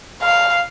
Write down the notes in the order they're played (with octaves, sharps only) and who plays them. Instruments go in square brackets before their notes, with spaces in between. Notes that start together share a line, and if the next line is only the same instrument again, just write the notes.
[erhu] F5